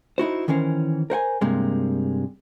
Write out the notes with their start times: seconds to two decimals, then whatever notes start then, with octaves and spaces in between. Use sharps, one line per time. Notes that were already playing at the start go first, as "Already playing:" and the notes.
0.18 D#4 E4 F#4 C5
0.48 D#3 E3 C#4 A#4 C5
1.10 A#4 C5 F#5 G#5
1.41 G2 C3 G#3 A#3